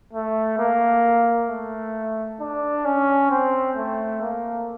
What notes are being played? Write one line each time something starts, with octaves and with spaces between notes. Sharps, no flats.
A3
A#3
A3
D4
C#4
C4
A3
A#3